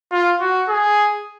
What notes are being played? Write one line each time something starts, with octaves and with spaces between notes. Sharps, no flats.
F4
F#4
G#4